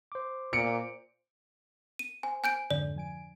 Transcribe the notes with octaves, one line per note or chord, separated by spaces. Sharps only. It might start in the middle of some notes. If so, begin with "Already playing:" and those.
C5 D6
A#2 C#7 D7
D#7
C5 G#5
G#5 G6 D7
F2 G#2 D3 D5
F3 G#5 D7